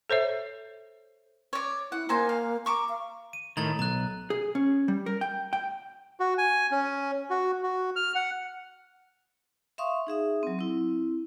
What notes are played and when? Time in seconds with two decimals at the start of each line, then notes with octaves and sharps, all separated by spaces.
0.10 A4 C5 C#5 E5
1.53 C#5 D5
1.92 E4 F#5
2.09 A#3 D#4 C5 G#5
2.29 F5
2.66 A#5 C#6 D6
2.89 F5
3.33 D#7
3.57 A2 D#3 A#5 G#6 A6
3.79 B1 A#5 F#6
4.30 G#4
4.55 C#4
4.88 G3
5.06 A#4
5.21 G5
5.53 G5
6.20 F#4
6.38 G#5
6.71 C#4
7.30 F#4
7.63 F#4
7.96 F6
8.15 F#5
9.78 E5 F5 C6 C#6 D#6
10.07 D#4 G#4 E5 D#6
10.43 F#3 C4
10.59 C4 E4